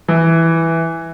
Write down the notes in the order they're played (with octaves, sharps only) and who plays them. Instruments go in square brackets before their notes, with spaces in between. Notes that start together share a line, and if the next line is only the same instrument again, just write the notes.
[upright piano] E3